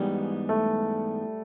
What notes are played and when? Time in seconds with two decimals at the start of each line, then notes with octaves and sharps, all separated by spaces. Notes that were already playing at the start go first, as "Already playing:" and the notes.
Already playing: G#2 E3 G3 G#3 B3 D#4
0.49 A3